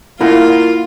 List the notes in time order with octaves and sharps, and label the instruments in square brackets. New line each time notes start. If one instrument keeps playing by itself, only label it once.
[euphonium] A#3 [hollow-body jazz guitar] E4 A#4 F#5 [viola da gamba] F4